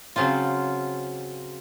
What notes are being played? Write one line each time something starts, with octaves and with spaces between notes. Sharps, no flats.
C#3 F#3 C4 F4